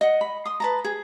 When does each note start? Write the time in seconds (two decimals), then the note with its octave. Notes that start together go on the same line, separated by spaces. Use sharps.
0.01 D#5 F#5
0.21 B5
0.45 C6 D#6
0.60 B4 A5 A#5
0.85 G#4